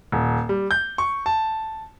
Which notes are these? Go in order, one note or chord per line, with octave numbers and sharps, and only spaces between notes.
D#1
G3
G6
C#6
A5